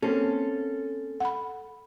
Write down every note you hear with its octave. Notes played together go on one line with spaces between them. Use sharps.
A#3 C4 C#4 A4
F#5 B5